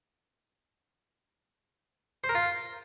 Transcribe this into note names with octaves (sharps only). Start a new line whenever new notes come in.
C5
A#4
F4